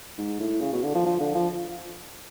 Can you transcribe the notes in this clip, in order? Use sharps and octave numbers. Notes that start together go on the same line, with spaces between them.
G#2
A2
C#3
B2
D3
F3
F3
D3
F3